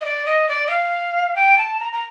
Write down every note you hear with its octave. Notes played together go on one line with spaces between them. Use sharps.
D#5
D5
D#5
D5
D#5
F5
G5
A5
A#5
A#5